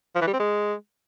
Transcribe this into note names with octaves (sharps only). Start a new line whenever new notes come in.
F3
E3
G3
C4
G#3